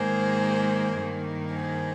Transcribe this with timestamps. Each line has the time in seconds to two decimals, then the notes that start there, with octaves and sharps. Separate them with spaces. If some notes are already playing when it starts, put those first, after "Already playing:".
Already playing: G#2 D#3 A#3 G#4 C5
0.94 G2 D#3 A#3
1.52 G#4 C5